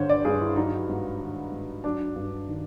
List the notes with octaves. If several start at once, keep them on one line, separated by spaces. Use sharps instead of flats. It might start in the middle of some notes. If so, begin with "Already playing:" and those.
Already playing: G2 D3 C5 C#5
D5
G2 G#4
E4
F#3 D#4
G#2
D#3
G#2
F#3 D4
G2
D#3